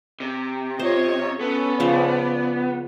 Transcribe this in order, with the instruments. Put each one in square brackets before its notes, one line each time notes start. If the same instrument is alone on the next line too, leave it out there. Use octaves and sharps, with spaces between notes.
[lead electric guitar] C3
[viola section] F4 C#5 D#5 [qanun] C5
[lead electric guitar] B3 [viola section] C#4 A4
[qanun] C#3 F3 [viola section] D5